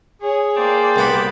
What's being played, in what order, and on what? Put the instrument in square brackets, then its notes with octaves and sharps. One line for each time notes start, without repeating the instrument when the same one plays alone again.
[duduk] G#4 [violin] C#5
[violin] A#3 D5 [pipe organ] C5 G5 A5
[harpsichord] C2 B3 B5